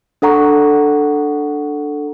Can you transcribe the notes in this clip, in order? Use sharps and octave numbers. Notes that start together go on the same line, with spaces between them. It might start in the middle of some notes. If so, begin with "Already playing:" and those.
D4 A4 F#5 A#5 C#6